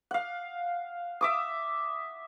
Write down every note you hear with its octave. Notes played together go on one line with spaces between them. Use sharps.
F5 F#5
E5 D6 D#6